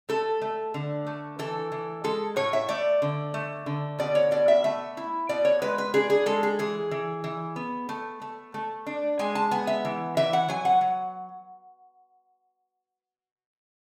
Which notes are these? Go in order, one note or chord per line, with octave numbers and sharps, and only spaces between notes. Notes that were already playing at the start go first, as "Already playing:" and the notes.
A3 A4
A3
D3
A3
E3 A4
E3
G#3 A4
A2 C#5
E5
A3 D5
D3
A3
D3
B2 D5
C#5
B2 D5
E5
A3 E5
E4
B2 D5
C#5
G#3 B4
B4
D4 G#4
G#4
G#3 A4
G#4
E3 G#4
E3
E3
B3
A3
A3
A3
D4
G#3 G#5
A5
B3 G#5
E5
E3
E3 E5
F#5
F#3 G#5
F#5
F#3